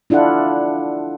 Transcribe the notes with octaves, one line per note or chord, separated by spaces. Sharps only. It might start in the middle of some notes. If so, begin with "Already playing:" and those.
D4 E4 F4 A4 F#5